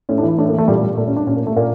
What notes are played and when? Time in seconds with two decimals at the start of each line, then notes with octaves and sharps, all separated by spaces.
0.09 A2 C#4
0.18 D4
0.23 E3
0.28 E4
0.38 A2 D4
0.48 A#3
0.53 E3
0.58 A3
0.68 A#2 G3
0.82 G3
0.97 A#2 A3
1.07 C#4
1.17 D4
1.27 A#2 C#4
1.36 A#3
1.47 A3
1.56 A#2 A#3